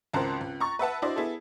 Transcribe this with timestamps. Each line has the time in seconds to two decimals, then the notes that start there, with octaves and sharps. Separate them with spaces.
0.13 G#1 C#2 A#4 C5 A5 F#6
0.41 C#2
0.60 A#5 C#6 A6
0.79 B4 E5 F#5 A5
1.02 D4 E4 F#4 C5 D5 D#5
1.16 B3 E4 G#4 A4